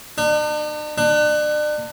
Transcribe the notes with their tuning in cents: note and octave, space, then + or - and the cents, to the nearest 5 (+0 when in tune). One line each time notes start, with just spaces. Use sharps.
D4 +45
D4 +35